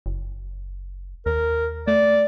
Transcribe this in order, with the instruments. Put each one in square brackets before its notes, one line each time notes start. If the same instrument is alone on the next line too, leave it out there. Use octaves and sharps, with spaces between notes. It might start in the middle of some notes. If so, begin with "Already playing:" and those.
[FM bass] F#1
[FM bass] D#2 [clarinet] A#4
[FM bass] A3 [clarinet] D5